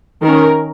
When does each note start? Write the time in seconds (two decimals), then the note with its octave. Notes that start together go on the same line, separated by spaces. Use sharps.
0.22 D#3 C#4 A#4